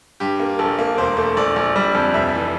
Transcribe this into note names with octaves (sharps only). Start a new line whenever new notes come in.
G2 G4
A#3
A#1 A4
A#3
E1 C5
A3
A#1 D5
A#1
G3
F2
F1 E5
E3